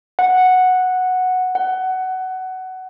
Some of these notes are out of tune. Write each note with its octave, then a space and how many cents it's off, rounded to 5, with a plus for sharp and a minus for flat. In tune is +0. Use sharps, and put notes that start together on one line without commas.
F#5 -5
F#5 +15